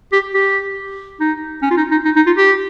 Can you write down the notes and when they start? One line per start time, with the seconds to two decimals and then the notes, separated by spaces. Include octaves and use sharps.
0.12 G4
0.34 G4
1.20 D#4
1.62 C#4
1.71 F4
1.77 D#4
1.91 D#4
2.05 D#4
2.16 D#4
2.26 F4
2.37 G4